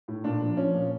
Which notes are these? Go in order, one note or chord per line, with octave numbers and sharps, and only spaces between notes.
A2
A#2 D4
F3
F3 C#4
A#2